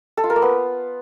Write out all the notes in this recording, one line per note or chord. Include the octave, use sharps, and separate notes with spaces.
A4
F4
A#4
A#3
B3